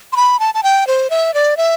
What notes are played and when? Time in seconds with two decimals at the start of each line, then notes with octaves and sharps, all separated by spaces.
0.13 C6
0.16 B5
0.40 A5
0.54 A5
0.63 G5
0.87 C5
1.10 E5
1.34 D5
1.57 E5